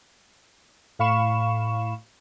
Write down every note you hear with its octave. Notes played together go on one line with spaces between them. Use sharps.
A2 F5 B5 C#6 E7